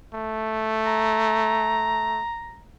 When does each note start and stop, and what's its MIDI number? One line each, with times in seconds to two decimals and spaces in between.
0.14 2.22 57
0.86 2.62 82